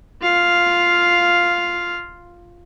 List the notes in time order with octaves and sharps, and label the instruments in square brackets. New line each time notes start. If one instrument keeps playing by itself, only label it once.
[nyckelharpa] F4 F5